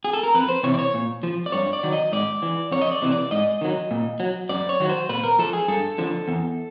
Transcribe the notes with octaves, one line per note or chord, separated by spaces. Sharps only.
G#4
A4
A#4
F2 B4
C5
C3 E3 C#5
D5
C#5
A#2
F3
D5
G2 C#5
D5
D#3 F#3
D#5
G#2 D5
E3
F2 C#5
D#5
D5
C3 E3
D5
G#2 D#5
D#3 F#3
A#2
F#3
F#2 D5
C#5
D#3 F#3
C5
A#2 B4
A#4
F3 A4
G#4
G2 A4
D3 F3
E2